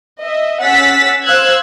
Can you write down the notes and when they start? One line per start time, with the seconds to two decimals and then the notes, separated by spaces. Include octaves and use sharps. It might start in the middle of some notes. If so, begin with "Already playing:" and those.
0.20 D#5 E5
0.60 C#4 F#5 E6 A6 B6
1.24 C5 F5 E6 F#6 G#6